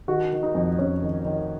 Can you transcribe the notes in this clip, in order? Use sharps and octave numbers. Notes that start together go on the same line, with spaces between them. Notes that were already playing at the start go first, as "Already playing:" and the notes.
D#3 F#4
D#3
D#4
F2
F2 C#4
D#3
D#3